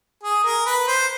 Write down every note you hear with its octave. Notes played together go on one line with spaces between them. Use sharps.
G#4
A#4
B4
C5